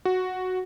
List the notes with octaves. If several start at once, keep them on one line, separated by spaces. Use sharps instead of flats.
F#4